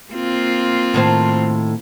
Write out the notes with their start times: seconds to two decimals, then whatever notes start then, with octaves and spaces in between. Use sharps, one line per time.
0.12 A#3 C4 F4
0.94 A2 D#3 C5